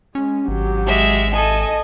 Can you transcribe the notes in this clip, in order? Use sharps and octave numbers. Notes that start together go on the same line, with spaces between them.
G#3 C#4
G#1 F#3 G4
G#3 E5
A4 D#5 G#5